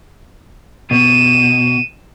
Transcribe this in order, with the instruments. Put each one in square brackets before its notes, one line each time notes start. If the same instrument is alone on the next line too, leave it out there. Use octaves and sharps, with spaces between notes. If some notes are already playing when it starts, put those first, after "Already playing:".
[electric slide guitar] B2 [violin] D#7 E7